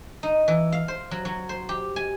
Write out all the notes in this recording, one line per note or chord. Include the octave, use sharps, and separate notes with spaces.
D#4
E3
F5
C5
F#3
F#3
C5
G4
G#5